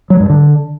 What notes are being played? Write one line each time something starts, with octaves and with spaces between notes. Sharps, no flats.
F#3
G2
D3